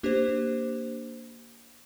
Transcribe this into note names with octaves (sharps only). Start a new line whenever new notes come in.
A#3 D4 G4 C5